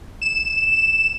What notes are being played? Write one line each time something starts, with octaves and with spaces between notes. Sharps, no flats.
E7